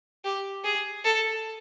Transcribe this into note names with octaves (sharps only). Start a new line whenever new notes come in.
G4
G#4
A4